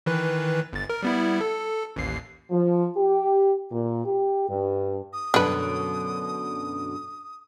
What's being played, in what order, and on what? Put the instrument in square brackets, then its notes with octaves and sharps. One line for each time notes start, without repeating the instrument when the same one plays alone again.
[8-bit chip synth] D#3 E3 B4
G1 A6
A#4
G3 B3 E4
A4
A1 D#2 C7
[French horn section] F3
G4
A#2
G4
G2
[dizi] D#6
[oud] F#2 B2 D3 [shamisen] D4 B4